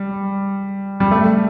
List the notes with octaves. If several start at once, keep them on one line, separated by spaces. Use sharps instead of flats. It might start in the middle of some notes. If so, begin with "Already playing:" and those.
Already playing: G3
G3
A3